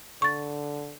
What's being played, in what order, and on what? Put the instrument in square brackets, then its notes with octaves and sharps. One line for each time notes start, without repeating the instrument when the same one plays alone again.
[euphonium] D3 [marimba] C#6 A6